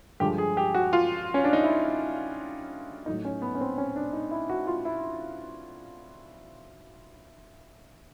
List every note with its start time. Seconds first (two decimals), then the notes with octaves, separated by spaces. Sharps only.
0.20 G2 D3 F3 G#3 G4
0.38 G#4
0.57 G4
0.74 F#4
0.93 F4
1.34 C#4
1.44 D4
1.53 D#4
1.64 E4
3.06 A2 F#3 D#4
3.25 C#4
3.42 B3
3.55 C#4
3.61 C4
3.78 C#4
3.96 D4
4.13 D#4
4.31 E4
4.49 F#4
4.67 F4
4.85 E4